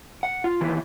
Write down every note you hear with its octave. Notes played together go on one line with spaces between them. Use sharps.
F#5
F4
D#2 E3